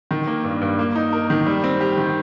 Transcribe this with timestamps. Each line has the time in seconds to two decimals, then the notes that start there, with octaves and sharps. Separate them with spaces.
0.11 D#3
0.27 A#3
0.44 G2
0.61 G2
0.79 A#3
0.96 D#4
1.13 A#4
1.30 D#3
1.47 G3
1.64 C4
1.81 G4
1.97 D#3